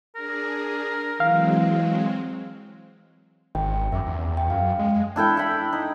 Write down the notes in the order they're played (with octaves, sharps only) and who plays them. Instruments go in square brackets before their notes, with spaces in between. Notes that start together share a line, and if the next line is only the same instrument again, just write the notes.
[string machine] D4 G#4 [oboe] A#4
[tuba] E3 [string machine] F#3 G#3 C4 [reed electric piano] F5
[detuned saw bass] G#1 [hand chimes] G5
[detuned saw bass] F#2 [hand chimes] E5 D6
[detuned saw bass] E2
[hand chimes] G5
[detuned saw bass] F#2 [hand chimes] F5
[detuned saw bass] G#3
[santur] D4 E4 A4 G5
E4 B5
D#4